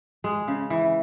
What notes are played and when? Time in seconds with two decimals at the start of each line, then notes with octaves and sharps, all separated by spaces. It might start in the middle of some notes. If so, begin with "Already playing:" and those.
0.24 G#3
0.48 C#3
0.70 E3